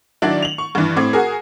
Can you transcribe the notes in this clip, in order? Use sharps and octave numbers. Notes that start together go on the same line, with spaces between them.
D#3 F#3 D4 E4 D5
F7 F#7
C#6
G2 E3
A2 C4 D6 G#6
F#4 G#4 A#4